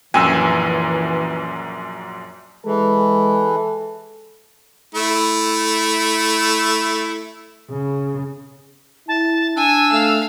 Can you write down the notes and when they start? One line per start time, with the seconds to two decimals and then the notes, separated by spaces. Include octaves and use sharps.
0.14 A#1 F#2 E3 G#5 E6
2.66 E3 G#3 A4
4.95 A3 E4
7.70 C#3
9.08 E4 A5
9.56 D4 G#5 E6
9.92 A3 F5